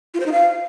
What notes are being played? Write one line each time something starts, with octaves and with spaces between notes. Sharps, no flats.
F4
C5
D#4
F5